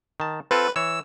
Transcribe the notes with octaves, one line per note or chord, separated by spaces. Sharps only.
D#3 A5
C4 F4 A4 B4
E3 C#5 E6